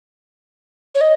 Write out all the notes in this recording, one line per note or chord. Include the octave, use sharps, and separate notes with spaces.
C#5
D#5